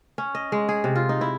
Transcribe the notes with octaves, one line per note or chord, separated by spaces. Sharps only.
C#4
D#5
G#3
G#4
C3
F4
D#4
E4